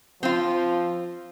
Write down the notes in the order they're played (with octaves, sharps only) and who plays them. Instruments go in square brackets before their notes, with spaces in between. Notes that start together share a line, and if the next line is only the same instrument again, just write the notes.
[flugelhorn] F3 [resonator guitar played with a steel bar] C4 F4